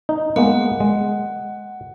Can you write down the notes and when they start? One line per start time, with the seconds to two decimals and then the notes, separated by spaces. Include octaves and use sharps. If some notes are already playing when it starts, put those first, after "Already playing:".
0.09 D#4
0.36 G#3 A#3 B3 F#5
0.80 G#3